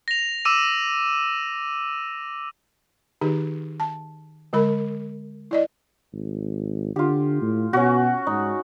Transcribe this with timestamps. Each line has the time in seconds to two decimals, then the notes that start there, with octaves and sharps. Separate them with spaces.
0.08 A#6 F7
0.45 D6 E6 D#7
3.21 D#3 D#4 G4 G#4
3.80 A5
4.53 D3 G#3 A#4 B5
5.51 E4 D5 D#5
6.13 G#1
6.96 D3 F4 G4
7.42 A2
7.73 B2 C#4 F#4
8.27 G#2 D#4